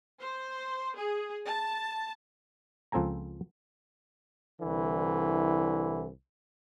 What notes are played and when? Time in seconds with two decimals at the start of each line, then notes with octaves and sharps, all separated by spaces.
0.20 C5
0.95 G#4
1.46 A5
2.92 C#2 F3 C4 A4 G#5 A#5
4.62 C2 D3 E3